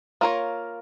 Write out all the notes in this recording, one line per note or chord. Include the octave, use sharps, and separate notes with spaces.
A#3 F4 A#4 C#5